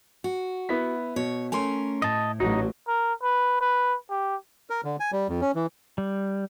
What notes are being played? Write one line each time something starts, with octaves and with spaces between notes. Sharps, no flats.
F#4
B3 E4 B6
B2 C#5
A3 C#4 A#4 G#5 C6
A2 D#5 A5
A1 F#3 D#4 F#4
A#4
B4
B4
G4
A#4
D3
G#5
G3
F2
C#4
E3
G3